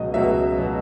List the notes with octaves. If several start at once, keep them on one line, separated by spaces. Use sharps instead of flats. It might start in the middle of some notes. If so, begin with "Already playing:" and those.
Already playing: C#2 B2 F#3 D#5
C#2 B2 F#3 E5
B2 F#3